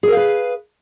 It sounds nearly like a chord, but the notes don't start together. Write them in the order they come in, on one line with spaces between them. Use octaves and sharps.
G#4 A#4 F5 B4